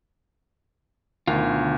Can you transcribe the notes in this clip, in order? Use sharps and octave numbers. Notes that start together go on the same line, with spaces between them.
D2 B2 D3 D#3 F4